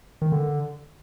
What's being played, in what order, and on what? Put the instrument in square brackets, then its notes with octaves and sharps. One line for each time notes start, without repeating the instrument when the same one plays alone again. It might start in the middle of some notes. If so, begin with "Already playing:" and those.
[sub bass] D#3
D3